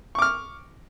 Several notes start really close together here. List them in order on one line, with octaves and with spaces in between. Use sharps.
C#6 D6 F6